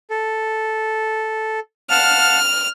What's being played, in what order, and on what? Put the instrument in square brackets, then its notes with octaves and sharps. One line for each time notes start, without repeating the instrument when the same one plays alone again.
[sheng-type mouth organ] A4
[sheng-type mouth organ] F5 F#5 A5 [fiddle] F6